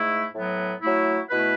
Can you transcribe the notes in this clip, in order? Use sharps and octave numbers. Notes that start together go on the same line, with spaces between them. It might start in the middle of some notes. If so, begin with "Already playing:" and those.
Already playing: G#2 A3 E4
A2 F#3 B3
F#3 A3 E4
B2 A3 E4 B4